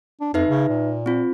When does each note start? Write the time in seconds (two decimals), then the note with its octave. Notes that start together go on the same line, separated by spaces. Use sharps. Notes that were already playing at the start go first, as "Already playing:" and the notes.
0.21 D4
0.34 F2 D#4 B4 E5
0.49 C#3
0.69 A#2
1.06 C4 F4